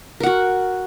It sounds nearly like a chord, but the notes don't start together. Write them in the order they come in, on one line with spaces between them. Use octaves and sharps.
A#4 F#5 F#4